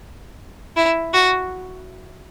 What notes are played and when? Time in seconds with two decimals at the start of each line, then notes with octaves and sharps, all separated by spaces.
0.76 E4
1.14 F#4